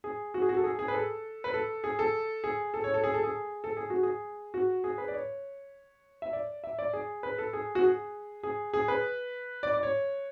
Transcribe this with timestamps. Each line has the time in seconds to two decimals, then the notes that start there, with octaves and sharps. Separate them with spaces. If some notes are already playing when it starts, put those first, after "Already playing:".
0.04 G#4
0.34 F#4
0.42 G#4
0.49 F#4
0.57 A4
0.64 G#4
0.79 G#4
0.88 B4
0.94 A4
1.44 B4
1.54 A4
1.84 G#4
1.99 A4
2.44 G#4
2.74 A4
2.84 C#5
2.94 A4
3.04 G#4
3.14 A4
3.24 G#4
3.64 A4
3.77 G#4
3.90 F#4
4.03 G#4
4.54 F#4
4.84 G#4
4.98 B4
5.08 D5
5.14 C#5
6.22 E5
6.33 D5
6.64 E5
6.79 D5
6.93 G#4
7.23 B4
7.38 A4
7.53 G#4
7.75 F#4
7.84 G#4
8.43 G#4
8.74 G#4
8.88 B4
9.63 D5
9.73 D5
9.83 C#5